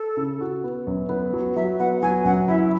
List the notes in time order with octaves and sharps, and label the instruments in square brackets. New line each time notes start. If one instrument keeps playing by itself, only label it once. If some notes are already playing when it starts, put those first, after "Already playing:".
Already playing: [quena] A4
[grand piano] C#3
F#4
B3
F#2
B3
F#3
[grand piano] F#3 [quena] E5
[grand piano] B3 [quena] F#5
[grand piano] F#3 [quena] G#5
[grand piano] F#2 [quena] F#5
[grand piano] E4 [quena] E5